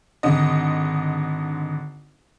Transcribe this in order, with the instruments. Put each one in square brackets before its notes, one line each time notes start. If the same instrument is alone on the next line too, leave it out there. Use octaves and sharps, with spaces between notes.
[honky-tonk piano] G#1 D3 D#5